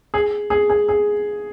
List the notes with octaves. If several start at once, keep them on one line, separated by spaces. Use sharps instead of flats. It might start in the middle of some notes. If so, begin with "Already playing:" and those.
G#4
G#4
G#4
G#4